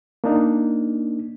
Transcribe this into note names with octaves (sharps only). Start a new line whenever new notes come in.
A#3 D4 D#4